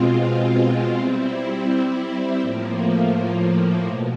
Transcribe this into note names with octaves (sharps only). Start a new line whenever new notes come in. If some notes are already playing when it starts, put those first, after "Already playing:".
Already playing: B2 G#3 C4 F4
G3 C4 E4
A2 F3 A#3
B2